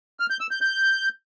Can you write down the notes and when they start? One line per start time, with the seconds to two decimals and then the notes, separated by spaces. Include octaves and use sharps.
0.20 F6
0.30 G6
0.41 E6
0.51 G6
0.62 G6